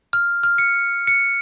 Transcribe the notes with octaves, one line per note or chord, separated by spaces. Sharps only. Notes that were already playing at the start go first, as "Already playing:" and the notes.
F6
F6
C#7
C#7